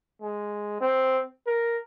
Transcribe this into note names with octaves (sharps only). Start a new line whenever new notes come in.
G#3
C4
A#4